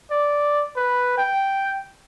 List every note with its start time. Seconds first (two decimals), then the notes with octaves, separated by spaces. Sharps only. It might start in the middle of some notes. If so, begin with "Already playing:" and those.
0.11 D5
0.76 B4
1.18 G5